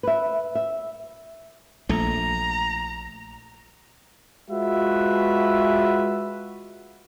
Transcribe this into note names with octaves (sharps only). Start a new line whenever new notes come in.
B4 E5
E5
A#1 A3 A#5
G#3 F4 F#4 B4 E5